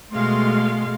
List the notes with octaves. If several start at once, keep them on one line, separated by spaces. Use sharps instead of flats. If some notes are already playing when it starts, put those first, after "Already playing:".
B2 G#3 A3 F5 C6